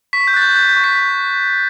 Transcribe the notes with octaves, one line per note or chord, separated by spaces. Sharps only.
C#6 B6
G6
F#6 A6
G6
F#6 G6
G6
C#6
B6